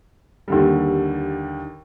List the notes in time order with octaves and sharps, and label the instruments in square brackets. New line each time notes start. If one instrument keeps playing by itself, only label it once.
[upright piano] D#2 D3 G3